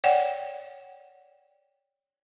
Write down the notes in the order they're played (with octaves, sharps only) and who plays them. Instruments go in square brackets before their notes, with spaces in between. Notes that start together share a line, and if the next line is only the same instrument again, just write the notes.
[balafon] C#5 D5 F#5 G5